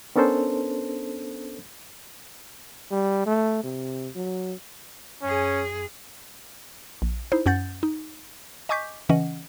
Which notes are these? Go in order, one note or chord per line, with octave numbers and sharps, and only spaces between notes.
B3 C#4 D4 A4 A#4 C5
G3
A3
C3
F#3
F#2 C#4 G#4
A#1
D#4 E4 C5
F#2 C#4 F#5 G6 A6
D#4
D#5 G#5 C#6 D6 G6 B6
C#3 E3 C#4 D#5 F#5